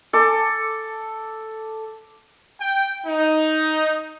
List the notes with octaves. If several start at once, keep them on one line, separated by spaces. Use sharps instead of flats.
A4 D6
G5
D#4